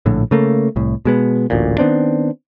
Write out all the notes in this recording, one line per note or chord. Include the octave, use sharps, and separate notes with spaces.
A#1 A2 D3
C#3 A3 A#3
C2 A2
B2 G#3 B3
D1 A1 D2 A#2
D#3 B3 C4 D4